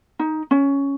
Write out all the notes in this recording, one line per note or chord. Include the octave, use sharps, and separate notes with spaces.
D#4
C#4